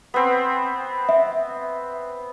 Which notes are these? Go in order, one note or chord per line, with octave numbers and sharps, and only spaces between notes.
B3 C4
E5